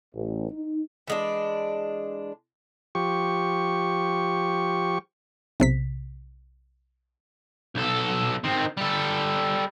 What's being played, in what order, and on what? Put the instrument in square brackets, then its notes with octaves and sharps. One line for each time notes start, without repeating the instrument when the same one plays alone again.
[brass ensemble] A1
D#4
[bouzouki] E3 G#3 D4
[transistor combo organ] F3 G4 C#6
[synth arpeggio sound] B1 C3 B6
[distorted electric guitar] B1 A4
D#3 C4
G3 A4